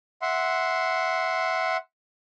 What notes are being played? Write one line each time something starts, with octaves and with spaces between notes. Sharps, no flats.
E5 F#5 C6